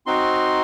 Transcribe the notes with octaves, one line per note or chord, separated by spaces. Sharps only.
C4 D#4 F#4 C6